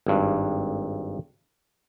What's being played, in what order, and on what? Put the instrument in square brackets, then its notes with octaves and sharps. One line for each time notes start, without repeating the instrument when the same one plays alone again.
[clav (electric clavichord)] G#1 G2